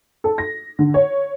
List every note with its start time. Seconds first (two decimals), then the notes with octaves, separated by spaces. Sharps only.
0.24 A4
0.38 A#6
0.79 D3
0.94 C#5